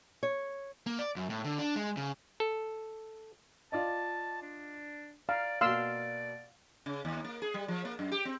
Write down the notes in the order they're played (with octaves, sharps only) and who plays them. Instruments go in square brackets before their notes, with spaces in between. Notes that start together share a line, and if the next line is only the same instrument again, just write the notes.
[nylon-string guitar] C#5
[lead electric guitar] A#3
D5
F#2
A2
D3
D4
G#3
C#3
[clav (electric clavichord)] A4
[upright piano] F4 D5 D#5 [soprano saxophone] A5
[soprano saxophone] D4
[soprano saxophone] D5 [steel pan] F5 [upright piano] A#5
[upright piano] B2 A#3 [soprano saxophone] D5 [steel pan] F5 C6 E6
[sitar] C#3
D#2
A#3
G#4
G3
F3
A#3
F#2
G4
C4